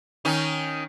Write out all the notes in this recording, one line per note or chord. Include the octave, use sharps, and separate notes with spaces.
D#3 C#4 D#4